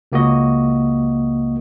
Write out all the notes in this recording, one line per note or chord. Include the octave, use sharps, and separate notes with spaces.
C#2 A#3 F#4 D#5